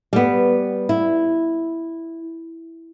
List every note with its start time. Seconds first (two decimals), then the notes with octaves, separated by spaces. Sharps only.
0.13 G3 B3
0.89 E4